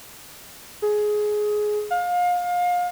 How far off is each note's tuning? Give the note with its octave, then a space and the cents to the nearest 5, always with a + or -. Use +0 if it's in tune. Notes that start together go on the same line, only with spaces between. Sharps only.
G#4 +15
F5 +30